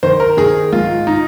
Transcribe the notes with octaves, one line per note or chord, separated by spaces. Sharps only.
D#3 C5
A#4
D#3 G#4
G#2 F4
D#4